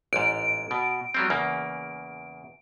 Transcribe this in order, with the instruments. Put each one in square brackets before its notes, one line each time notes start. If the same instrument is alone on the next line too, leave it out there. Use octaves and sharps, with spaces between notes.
[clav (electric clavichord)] A1 G#2 [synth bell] D7
[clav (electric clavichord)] B2
F#3 G3 C4
E2 C#3 A#3